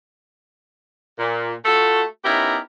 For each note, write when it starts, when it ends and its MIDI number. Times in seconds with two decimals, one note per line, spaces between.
1.19 1.53 46
1.65 2.03 57
1.65 2.03 65
1.65 2.03 66
1.65 2.03 69
2.25 2.58 59
2.25 2.58 61
2.25 2.58 63
2.25 2.58 64
2.25 2.58 67
2.25 2.58 70